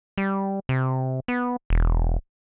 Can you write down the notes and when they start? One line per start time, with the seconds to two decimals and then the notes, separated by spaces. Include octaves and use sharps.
0.18 G3
0.69 C3
1.28 B3
1.70 E1